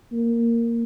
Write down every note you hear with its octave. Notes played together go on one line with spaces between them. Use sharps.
A#3